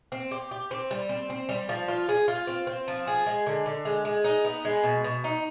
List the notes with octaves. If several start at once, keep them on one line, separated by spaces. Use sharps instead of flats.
C4
G4
G4
C4
G3
C4
C4
G3
F3
F4
G#4
F4
C4
C4
F3
G#4
G#3
D3
D3
G#3
G#3
D#4
B3
G#3
B2
B2
D#4